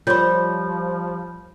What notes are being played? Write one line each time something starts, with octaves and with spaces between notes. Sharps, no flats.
F3 G3 F4 A#4 C5 C#5 B5 G6